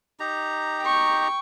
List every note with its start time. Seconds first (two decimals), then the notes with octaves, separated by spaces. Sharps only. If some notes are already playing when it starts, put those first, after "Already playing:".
0.20 D#4 G4 A#5
0.81 G5 C#6